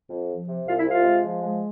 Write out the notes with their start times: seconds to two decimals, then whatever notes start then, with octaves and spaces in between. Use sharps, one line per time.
0.09 F2
0.28 F3
0.47 C3
0.66 C2 F4 F5
0.78 E4 E5
0.85 C3
0.91 F4 F5
1.04 G#3
1.23 F3
1.42 G#3